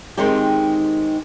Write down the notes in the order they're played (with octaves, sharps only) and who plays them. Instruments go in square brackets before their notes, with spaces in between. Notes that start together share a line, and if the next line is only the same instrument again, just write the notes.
[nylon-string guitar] D#3 G#3 C4 D#4 G4